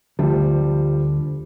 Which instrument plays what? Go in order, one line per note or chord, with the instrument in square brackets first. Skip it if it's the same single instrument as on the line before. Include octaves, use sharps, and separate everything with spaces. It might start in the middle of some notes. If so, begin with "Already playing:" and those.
[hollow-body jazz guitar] D2 [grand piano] F3 G3